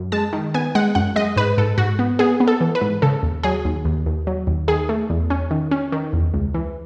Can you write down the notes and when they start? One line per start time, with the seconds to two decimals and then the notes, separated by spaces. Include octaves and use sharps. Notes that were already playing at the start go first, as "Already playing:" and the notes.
Already playing: F#2
0.12 G#3 A5
0.33 D#3
0.54 B3 G#5
0.75 G#3 F#5
0.95 F#2 F#5
1.16 G#3 D#5
1.36 G#2 B4
1.58 G#2 A4
1.78 G#2 F#4
1.99 B3
2.19 B3 G#4
2.40 B3
2.47 A4
2.61 E3
2.75 B4
2.81 G#2
3.02 C#3 A4
3.23 D#2
3.43 F#3 G#4
3.65 D#2
3.85 D#2
4.06 D#2
4.27 F#3
4.47 D#2
4.68 D#3 G#4
4.89 A3
5.10 E2
5.30 C#4
5.51 D#3
5.71 C#4
5.92 D#3
6.13 E2
6.34 C#2
6.54 E3